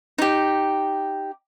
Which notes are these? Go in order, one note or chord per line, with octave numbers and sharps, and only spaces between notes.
D#4 G4